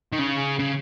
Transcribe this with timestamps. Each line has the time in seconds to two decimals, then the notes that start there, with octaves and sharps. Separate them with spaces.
0.12 D#3
0.19 C#3
0.59 C#3